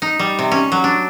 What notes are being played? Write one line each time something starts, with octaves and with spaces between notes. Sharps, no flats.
D#4
G3
C3
C#4
F#3
D4